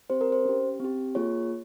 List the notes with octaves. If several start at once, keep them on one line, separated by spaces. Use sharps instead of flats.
C4 G4 C5
A#4
C5
C#4 G4
C4 G4
A#3 F4 G#4 C#5